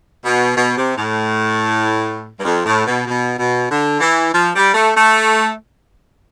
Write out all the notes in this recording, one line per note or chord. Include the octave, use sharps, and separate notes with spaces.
B2
B2
C3
A2
G2
F2
A2
B2
B2
B2
D3
E3
F3
G3
A3
A3